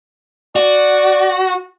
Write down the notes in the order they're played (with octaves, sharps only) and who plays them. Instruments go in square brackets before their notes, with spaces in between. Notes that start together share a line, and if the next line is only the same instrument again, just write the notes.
[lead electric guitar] F#4 [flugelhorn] D5